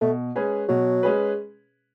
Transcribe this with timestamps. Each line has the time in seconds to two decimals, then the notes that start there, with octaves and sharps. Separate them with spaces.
0.01 B2 A3
0.36 G#3 C#4 G#4 B4
0.69 B2 F#3
1.03 G#3 C#4 G#4 B4